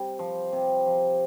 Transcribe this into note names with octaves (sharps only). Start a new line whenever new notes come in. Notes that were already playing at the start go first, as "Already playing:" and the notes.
Already playing: C3 G3
F3
C3
F3